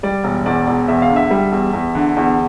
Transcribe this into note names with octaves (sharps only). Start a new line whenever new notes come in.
G3 D5
E1
E2 D5
E1
E2 E5
F5
D3
E5
G3
E2
E2
D3
E2